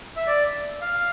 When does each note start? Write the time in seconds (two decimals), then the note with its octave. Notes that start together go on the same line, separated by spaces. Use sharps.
0.17 E5
0.27 D5
0.81 F5